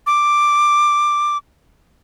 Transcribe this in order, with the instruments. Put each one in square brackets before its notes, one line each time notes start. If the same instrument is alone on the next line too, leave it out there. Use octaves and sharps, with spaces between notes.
[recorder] D6